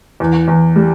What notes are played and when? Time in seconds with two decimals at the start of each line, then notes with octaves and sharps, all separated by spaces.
0.20 E2
0.48 E2
0.76 G3